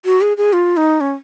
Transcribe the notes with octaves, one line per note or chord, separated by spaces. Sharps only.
F#4
G#4
G#4
F4
D#4
C#4